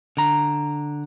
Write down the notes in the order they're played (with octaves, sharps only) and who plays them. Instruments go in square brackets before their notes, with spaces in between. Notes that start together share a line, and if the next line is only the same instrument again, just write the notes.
[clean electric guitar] D3 A#5